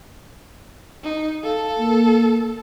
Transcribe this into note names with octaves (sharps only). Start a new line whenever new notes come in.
D#4
A4 F5
A#3